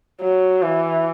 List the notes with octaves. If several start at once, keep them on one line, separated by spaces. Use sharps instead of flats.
F#3
E3